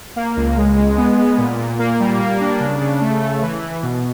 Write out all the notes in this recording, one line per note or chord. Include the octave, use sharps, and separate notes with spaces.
A#3
C#2
G#3
G#3
B3
B3
A#2
A#2
A#3
G3
A#3
D4
C#3
C#3
A3
A3
E3
E3
B2